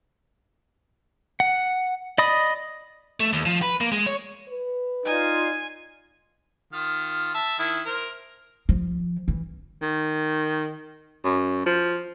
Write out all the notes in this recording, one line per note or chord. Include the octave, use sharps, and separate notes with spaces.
F#5
D5 D#5 B5 D#6
A3
D#2
F3
B4
A#3
G#3
C#5
B4
D#4 F4 D5 G#5
D#3 F4 F6
E5 A5
D#3 E4
A#4 C5
F3
E3
D#3
F#2
F3